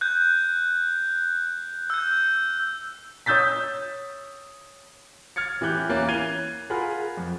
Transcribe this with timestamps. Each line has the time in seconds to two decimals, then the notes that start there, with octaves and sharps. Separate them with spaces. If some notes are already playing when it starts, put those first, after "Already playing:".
0.01 F#6 G6
1.90 E6 G6
3.26 C#5 D#6 E6 G6 A6 B6
5.36 F6 G#6 A6 C#7
5.61 A2 E3 G4 F#6 G6
5.89 E2 E3 A#3 C#4 F#6 A6
6.08 F#6 G#6 C7 D#7 F7 G7
6.70 F4 G#4 A#4 F#5 B5 F6
7.17 F2